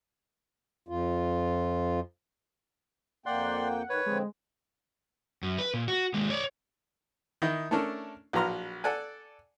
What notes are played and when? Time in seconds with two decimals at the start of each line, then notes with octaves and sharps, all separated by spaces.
0.88 F2 F4
3.26 F2 A#3 D5 F#5 G5 C6
3.89 D#3 B4 C#5
4.06 D3 F3 G#3 C4
5.43 F#2
5.58 B4
5.74 A#2
5.88 F#4
6.14 D#2 G#3
6.30 C#5 D5
7.42 D#3 D#4 E4
7.71 A3 C#4 D4 A4 A#4
8.33 A#1 F#3 B4 A#5 C6 F6
8.84 A4 D5 F#5 G#5